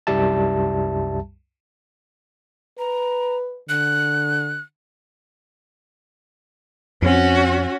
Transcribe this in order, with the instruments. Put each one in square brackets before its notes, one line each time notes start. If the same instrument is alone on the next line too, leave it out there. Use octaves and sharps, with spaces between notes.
[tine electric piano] C2 F#2 G3 G4 E5 A5
[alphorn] B4 [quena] A#5
[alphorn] D3 [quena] F#6
[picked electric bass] F2 C4 [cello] C#4 F#4